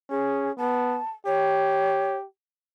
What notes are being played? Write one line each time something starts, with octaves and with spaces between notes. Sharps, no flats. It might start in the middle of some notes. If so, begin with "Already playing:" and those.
C#4 G#4
B3 A5
G4 C#5